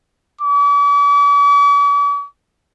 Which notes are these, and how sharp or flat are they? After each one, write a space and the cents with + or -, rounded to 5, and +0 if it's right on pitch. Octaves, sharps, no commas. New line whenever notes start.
D6 -45